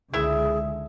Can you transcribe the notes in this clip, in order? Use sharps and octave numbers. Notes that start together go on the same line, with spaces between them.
C#2 D3 G#3 E4 G#4 E5